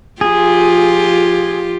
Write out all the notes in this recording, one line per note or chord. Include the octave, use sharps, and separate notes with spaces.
F3 F4 G4 G#4